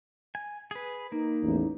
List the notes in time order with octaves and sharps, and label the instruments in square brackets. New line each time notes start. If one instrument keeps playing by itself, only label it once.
[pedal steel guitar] G#5
G#4 B4
[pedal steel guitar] A#3 [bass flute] D#4
[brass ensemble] A1 E2